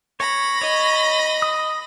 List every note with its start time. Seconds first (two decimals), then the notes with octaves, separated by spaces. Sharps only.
0.20 C#5 B5 A#6
0.61 C#5 D#5
1.42 D#6